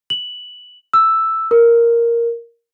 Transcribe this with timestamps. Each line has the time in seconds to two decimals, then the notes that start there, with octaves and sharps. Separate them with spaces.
0.10 F#7
0.93 E6
1.51 A#4